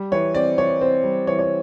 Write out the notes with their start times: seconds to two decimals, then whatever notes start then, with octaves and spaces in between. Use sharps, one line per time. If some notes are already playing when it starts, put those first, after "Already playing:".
Already playing: G3
0.12 E3 C#5
0.34 C4 D5
0.58 E3 C#5
0.81 C4 C5
1.04 G3
1.27 E3 C#5
1.39 C#5